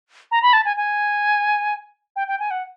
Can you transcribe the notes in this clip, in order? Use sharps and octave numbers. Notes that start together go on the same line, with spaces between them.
A#5
B5
A5
G#5
G#5
G5
G5
G#5
F#5